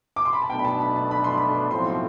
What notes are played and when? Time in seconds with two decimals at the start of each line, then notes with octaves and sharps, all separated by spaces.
0.16 D6
0.25 C6
0.33 B5
0.42 A5
0.50 B1 B2 A3 D4 G5
0.59 B5
0.65 A5
0.80 B5
0.96 A5
1.11 B5
1.24 C6
1.38 B5
1.71 B1 A2 F3 C4 C6
1.86 C6